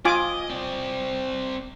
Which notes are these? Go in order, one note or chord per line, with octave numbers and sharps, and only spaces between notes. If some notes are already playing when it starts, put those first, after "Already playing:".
F4 D#5 G#5 D6
C4 D5